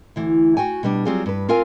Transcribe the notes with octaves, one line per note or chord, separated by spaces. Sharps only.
D2 E3
F#4 G5 G#5
B2 G3 D4
F#3 G3 C4 F4 G#4
G2 B4
C4 F4 A#4 F5 G#5